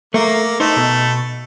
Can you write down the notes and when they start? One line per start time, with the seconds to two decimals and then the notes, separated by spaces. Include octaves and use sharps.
0.14 A3 A#3
0.60 A3 D#4 C5
0.76 B2